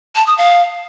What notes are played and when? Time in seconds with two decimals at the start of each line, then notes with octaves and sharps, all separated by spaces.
0.15 A5
0.27 D#6
0.38 F5